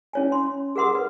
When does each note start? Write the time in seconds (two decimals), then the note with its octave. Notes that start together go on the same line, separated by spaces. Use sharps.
0.13 C#4 C#5 G#5
0.32 C6
0.76 G#4 A#4 F#5 C6 D#6
0.95 B4